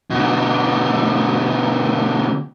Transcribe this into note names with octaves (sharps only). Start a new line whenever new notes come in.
B2 D3